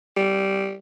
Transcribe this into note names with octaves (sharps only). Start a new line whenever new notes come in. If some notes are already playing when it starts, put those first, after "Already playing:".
G3